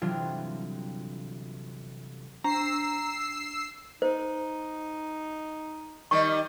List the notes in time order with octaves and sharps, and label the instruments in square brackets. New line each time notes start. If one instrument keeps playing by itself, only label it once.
[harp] G1 C3 E3 F#3 D4 F4
[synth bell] D4 [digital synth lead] A#5 [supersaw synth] E6 C7
[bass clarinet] D#4 [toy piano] C5
[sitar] D#3 G3 [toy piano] C#6